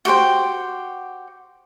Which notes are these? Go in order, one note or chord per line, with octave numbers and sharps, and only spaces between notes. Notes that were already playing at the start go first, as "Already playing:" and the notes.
F#4 G4 C5 G5